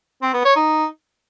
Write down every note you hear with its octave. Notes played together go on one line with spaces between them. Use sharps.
C4
B3
C#5
D#4